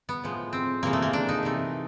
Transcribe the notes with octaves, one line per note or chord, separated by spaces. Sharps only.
B3
A2 F3 G#3
C4
C3 E3 G#3 A#3
A3
A#3
D4
D#4
C3 E3 A3